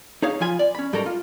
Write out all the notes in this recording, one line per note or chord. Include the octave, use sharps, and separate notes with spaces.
D#4 G#4 C#5 F5
F3 F4 G#5 B5
D5
C#4 B5
G#2 G3 F#4 A4 A#4 A#5
F4